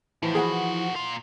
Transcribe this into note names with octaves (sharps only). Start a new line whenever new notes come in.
A2 E3 F3
D#3 F#4 G#4 F#5 B5
A#2 F4